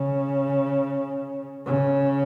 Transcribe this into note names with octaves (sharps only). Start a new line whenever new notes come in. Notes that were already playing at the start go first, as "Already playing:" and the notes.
Already playing: C#3
C#3